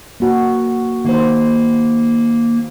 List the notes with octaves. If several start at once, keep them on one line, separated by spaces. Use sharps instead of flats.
A#3 F#4
D#3 A#3 D#4 C5